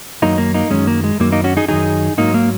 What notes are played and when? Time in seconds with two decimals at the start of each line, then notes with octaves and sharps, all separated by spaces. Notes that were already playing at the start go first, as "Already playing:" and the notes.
0.22 F#2 D#3 F#3 A#3 D#4
0.38 A#3
0.54 A#3 D#4
0.70 F#2 D#3 F#3 G#3 C#4
0.87 A#3
1.04 G#3
1.20 F#2 D#3 F#3 A#3
1.32 A#3 D#4
1.44 C#4 F#4
1.57 D#4 G#4
1.68 F#2 D#3 F#3 D#4 G#4
2.18 G#2 F#3 A#3 D#4
2.34 A#3